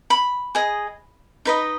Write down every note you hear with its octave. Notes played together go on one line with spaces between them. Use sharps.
B5
G#4 D#5
D#4 B4 D#5